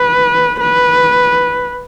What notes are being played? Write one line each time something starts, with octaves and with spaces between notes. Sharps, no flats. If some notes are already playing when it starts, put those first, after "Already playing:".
Already playing: B4
B4